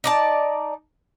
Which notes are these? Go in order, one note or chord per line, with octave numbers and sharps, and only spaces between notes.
D#4 D5 A5